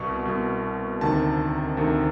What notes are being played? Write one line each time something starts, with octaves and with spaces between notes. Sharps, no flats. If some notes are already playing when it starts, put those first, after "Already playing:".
Already playing: C2 B2 C#6
C2 B2
D2 C3 D#3 A5
D2 C3 D#3